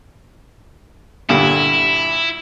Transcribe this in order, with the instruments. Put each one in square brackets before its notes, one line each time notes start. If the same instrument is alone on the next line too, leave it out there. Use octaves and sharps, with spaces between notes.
[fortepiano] G2 A#2 D3 [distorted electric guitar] E4